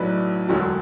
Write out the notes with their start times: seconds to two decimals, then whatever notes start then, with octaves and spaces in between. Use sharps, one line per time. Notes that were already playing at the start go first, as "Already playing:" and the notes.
Already playing: B1 A2 F#3 B4 D5
0.49 E1 D2 D3 F#3